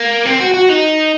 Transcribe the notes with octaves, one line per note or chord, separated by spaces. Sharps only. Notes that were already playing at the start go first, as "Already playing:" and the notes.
Already playing: A#3
C4
F#4
F#4
D#4